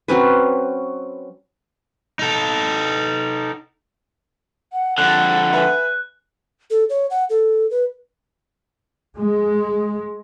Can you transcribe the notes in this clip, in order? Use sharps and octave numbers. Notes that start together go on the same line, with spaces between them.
F#3 C4 C#4 B4
D#4 A4
F#5
F2 D3 F#5 F#6
B4 E5 G#5
A4
C#5
F#5
A4
B4
G#3